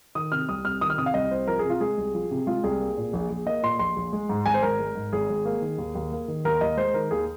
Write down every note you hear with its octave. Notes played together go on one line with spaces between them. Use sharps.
D#3 D#6
C3 F6
C2 D#6
C2 F6
D#3 D#6
F6
C3 D#6
F5
C2 D#5
C2 C5
F3 A#4
G#4
C3
F4
G#3 G#4
C2
F3
C3
G#3 F4
C2 G#4
A#3
A#2
A#1
A#1
A#3 D#5
A#2 C6
A#1 C6
A#1
G#3
G#2
G#1 G#5
C5
G#1 A#4
G#3
G#2
G#1 G#4
G#1
A#3
D#3
D#2
D#2
A#3
D#3
D#2 A#4
D#2 D#5
G#3 C5
D#3 A#4
D#2 G#4